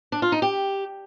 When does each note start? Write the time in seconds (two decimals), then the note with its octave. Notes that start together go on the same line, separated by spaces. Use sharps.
0.12 D4
0.22 F4
0.32 D#4
0.42 G4